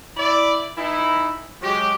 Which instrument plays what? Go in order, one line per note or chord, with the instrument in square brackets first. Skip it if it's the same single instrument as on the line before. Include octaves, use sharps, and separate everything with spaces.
[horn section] E4 D5
E3 D#4 E4
F#3 G#3 G4